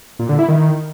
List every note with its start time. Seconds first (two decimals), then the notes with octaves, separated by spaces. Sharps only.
0.19 A#2
0.29 D3
0.39 E4
0.49 D#3